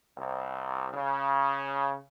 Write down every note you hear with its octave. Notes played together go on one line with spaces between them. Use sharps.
C2
C#3